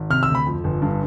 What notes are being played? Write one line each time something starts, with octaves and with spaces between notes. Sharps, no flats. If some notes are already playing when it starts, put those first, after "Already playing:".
Already playing: G#1
C3 F6
E6
D2
B5
F2
G1
G2